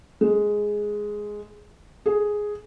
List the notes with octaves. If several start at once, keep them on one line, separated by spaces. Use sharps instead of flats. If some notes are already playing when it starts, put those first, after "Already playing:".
G#3
G#4